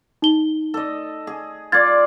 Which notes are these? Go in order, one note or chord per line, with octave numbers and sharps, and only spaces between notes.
D#4 G7
A4 D#5
G#4
F4 D5 G#6 A6